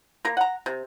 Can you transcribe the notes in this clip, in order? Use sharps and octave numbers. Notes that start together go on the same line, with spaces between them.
A#3 A#4
F#5 A#5
C3